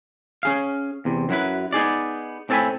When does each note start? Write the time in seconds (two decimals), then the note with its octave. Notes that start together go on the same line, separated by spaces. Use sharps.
0.43 C#4 G#4 F5
1.05 E2 C3
1.29 F#2 F#3 E4 B4
1.73 B3 D#4 G#4 D5
2.49 A2 C4 A4 C#5 G#5 B5